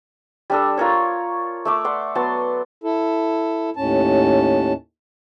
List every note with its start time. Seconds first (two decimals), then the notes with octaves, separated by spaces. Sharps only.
0.50 G3 D4 A4
0.77 F4 A#4 C#5
1.65 A3 E5 D6
1.84 D5 F#5 C6
2.15 F#3 B3 A5 C6
2.84 E4 A4
3.76 D#2 A2 C#4 A5